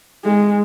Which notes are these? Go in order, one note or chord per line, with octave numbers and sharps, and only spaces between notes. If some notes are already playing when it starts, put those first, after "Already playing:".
G#3